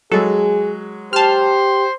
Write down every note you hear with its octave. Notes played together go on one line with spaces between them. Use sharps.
F#3 G#3 G#4 A4
G4 C5 A5 C6 F6